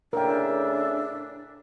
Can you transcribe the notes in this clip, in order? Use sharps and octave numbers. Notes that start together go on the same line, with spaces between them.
A2 C#3 D4 A#4 E5 G5